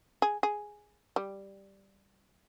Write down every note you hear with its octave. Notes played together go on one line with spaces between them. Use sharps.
G#4
G#4
G3